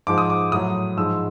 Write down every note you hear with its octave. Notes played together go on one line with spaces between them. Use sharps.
G#2 F3 G#3 D6
D#6
D6
A2 F#3 D#6
G#2 F3 G#3 E6